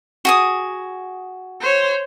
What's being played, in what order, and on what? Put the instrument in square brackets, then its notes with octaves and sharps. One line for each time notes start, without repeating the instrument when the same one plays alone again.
[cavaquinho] F#4 G#4 D#6
[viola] C5 C#5